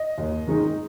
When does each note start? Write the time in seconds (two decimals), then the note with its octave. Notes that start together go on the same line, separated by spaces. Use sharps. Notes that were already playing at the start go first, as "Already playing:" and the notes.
Already playing: D#5
0.18 D#2
0.47 D#3 G#3 D#4